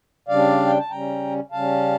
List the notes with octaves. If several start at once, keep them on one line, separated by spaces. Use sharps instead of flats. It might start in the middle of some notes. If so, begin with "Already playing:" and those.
C#3 G3 D4 D5 F5
G5
A5
C#3 G3 C#4 G5 A#5
C#3 G3 C#4 F5 A5